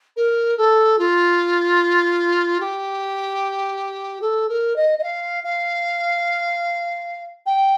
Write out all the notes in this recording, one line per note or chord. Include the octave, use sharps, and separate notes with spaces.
A#4
A4
F4
G4
A4
A#4
D#5
D#5
F5
F5
G5